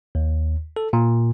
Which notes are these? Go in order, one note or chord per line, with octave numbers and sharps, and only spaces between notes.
D#2
A4
A#2